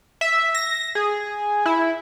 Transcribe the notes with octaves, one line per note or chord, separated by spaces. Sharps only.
E5
A#6
G#4
E4